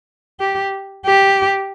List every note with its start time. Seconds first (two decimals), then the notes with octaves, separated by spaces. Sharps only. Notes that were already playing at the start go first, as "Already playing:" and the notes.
0.40 G4
1.06 G4